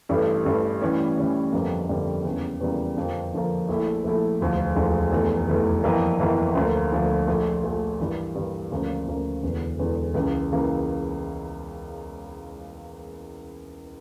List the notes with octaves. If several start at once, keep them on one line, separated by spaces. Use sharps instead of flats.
A1 G2 E3 A3
A1 G2 E3 A3
A2 E3 G3 C#4
A2 E3 G3 C#4
G1 F2 D3 G3 A#3
G1 F2 D3 G3 A#3
E2 C#3 G3 A#3
E2 C#3 G3 A#3
F2 D3 F3 A#3
F2 D3 F3 A#3
A#1 A#2 A3 E4
A#1 A#2 A3 E4
E1 D2 D3 F3
E1 D2 D3 F3
F1 E2 E3 A3
F1 E2 E3 A3
G1 F2 E3 A#3 E4
G1 F2 E3 A#3 E4
D2 D3 F3 A#3
D2 D3 F3 A#3
A#1 A#2 A3
A#1 A#2 A3
G2 E3 A#3
G2 E3 A#3
D2 C#3 F3 A#3
D2 C#3 F3 A#3
E1 E2 D3
E1 E2 D3
C#2 C#3 E3 A#3
C#3 E3 A#3